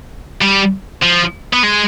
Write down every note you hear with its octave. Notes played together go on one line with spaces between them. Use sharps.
G3
F3
B3
G#3